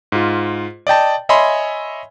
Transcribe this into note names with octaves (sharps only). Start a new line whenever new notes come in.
G#2 F4
D5 D#5 G5 A5
C#5 D#5 E5 G#5 B5 C6